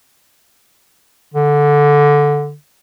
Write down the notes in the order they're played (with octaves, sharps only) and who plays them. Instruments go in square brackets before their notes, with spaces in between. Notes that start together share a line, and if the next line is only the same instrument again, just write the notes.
[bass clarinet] D3